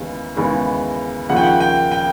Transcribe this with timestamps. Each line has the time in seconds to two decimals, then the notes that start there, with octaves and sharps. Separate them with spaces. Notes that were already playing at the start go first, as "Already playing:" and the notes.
Already playing: D#2 C#3 E3 G#3 B3
0.36 D#2 C#3 E3 G#3 B3
1.29 D#2 C#3 F3 A#3 F#5
1.36 G5
1.44 F#5
1.60 G5
1.91 G5